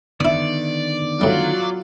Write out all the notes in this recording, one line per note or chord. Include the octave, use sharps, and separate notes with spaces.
D3 D#3 B3 E4 D5 D#6
A2 F#3 G3 F4